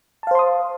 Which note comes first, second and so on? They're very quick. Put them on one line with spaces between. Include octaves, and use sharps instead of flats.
A5 F5 C5 C6 D#6